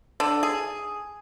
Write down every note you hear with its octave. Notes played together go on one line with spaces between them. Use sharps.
D3
G#4